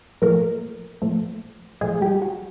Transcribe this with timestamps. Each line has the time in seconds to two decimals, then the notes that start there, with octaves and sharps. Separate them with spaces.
0.22 A#2 F3 A3 A#3 A#4
1.02 A#2 F3 A3
1.81 A#2 F3 G#3 A3 G#4
2.01 G3 G4
2.22 F#4